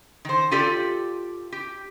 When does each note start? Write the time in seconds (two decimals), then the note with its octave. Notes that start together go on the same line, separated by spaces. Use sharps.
0.25 D#3 C5
0.51 F4 G4 A4 D5
1.52 G4